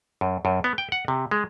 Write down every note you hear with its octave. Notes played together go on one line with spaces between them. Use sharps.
F#2
F#2
B3
G5
F#5
C3
G#3